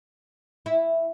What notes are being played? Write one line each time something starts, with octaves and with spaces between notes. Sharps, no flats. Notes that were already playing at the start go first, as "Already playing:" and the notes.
E4